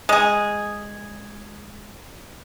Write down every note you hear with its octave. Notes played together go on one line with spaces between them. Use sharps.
G#3 G#4